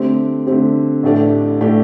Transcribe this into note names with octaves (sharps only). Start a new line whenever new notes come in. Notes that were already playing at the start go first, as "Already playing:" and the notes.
Already playing: D3 A3 C4 G4
D3 A3 C4 G4
A1 A2 A3 D4 G4
A2 A3 D4 G4